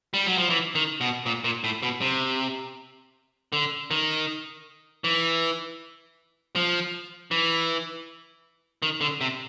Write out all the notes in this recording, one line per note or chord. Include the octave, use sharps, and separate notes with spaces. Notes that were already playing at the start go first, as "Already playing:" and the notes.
G3
F#3
F3
E3
D#3
B2
A#2
A#2
A2
B2
C3
D3
D#3
E3
F3
E3
D#3
D3
C3